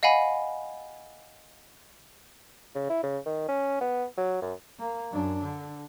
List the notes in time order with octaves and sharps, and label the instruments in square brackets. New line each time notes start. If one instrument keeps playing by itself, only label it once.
[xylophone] D#5 F5 F#5 G#5 B5
[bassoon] C#3
E4
C#3
D#3
C#4
B3
F#3
F#2
[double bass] A#3
F#2 D4
D3